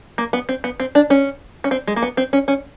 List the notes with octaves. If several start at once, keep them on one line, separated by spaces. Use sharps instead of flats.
A#3
B3
C4
B3
C4
D4
C#4
C#4
C4
G#3
A#3
B3
C4
C#4
C#4